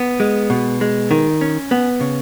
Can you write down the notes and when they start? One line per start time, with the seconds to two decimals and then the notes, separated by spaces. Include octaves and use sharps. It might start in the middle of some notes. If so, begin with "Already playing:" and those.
Already playing: B3
0.20 G#3
0.50 B2
0.81 G#3
1.11 D#3
1.41 C#4
1.71 B3
2.01 C#3